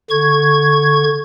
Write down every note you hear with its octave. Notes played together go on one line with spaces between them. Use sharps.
D3 C#6 G#6